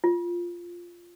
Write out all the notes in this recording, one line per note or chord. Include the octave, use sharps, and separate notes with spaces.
F4